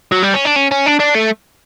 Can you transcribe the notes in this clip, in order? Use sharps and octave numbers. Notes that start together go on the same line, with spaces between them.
F#3
G3
C#4
D4
C#4
C#4
D4
D4
A3